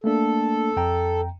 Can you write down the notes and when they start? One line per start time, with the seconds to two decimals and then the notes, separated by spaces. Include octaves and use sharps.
0.04 A3 A#3 D4 A4
0.77 F2 G5 A#5